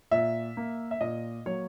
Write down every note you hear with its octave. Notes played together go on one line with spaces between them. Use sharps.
A#2 E5
A#3
E5
A#2 D#5
F#3 A#3 C#5